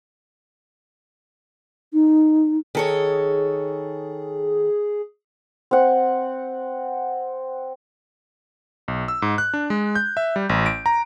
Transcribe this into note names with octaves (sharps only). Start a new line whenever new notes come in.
D#4
D#3 G#4 A4 C#5
C4 F#5
B1
E6
G#2
F#6
D4
G#3
G6
E5
G3
A1
D7
A#5